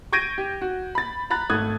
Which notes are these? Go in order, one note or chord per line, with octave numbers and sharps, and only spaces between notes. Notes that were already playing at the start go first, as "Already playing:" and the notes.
C#6 G6 G#6 A#6 D7 D#7
G4
F#4
B5 A6
A#5 B5 F#6 A6
G#1 A3 D#6 F#6 G#6